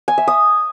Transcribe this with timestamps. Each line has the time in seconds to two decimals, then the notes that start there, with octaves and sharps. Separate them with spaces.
0.08 G#5
0.18 E5
0.28 D#6